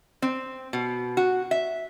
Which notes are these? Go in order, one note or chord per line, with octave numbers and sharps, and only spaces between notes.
C4
B2
F#4
E5